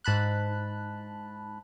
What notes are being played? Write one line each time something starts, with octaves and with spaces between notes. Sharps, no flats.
G#2 A5 B5 F#6